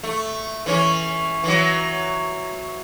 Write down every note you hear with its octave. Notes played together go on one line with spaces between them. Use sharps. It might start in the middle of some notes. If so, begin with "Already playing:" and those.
A3
E3 C#4
E3 F#3